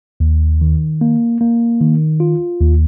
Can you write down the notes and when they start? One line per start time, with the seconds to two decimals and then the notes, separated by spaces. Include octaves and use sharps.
0.20 D#2
0.61 D#3
1.01 A#3
1.41 A#3
1.81 D#3
2.20 F4
2.60 D#2